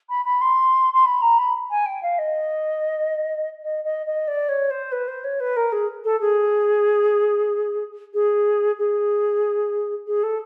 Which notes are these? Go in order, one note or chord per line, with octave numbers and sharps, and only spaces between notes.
B5
B5
C6
C6
B5
A#5
B5
G#5
G5
F5
D#5
D#5
D#5
D#5
D5
C#5
C5
B4
C5
C#5
B4
A#4
G#4
A4
G#4
G#4
G#4
G#4
A4